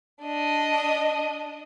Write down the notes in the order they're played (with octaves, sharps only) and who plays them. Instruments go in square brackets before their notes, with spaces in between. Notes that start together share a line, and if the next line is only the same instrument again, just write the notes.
[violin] D4 D#5